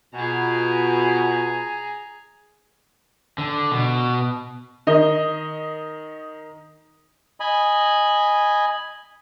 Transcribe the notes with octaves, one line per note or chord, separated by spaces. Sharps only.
B2 F4 G#4 G#5 A#5
D3
B2
D#3 D#5
D#5 G#5 B5